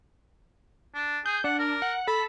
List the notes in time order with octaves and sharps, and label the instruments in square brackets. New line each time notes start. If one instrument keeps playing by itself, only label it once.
[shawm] D4
[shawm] G#4 [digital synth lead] G6
[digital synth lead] D4 [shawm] F#5
[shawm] A#4
[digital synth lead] F#5
[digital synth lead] A4 [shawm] B5